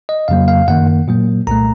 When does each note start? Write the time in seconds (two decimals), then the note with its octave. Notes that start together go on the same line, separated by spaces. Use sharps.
0.09 D#5
0.28 F2 C#3 F#3 A#3 F5
0.48 F5
0.68 F#2 D#3 A#3 F#5
1.08 A#2 F#3 A#3
1.47 C2 A#2 A3 A#5